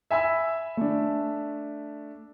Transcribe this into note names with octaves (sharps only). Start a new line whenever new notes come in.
E5 G#5 B5 E6
A3 D4